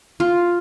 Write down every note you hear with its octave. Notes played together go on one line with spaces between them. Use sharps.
F4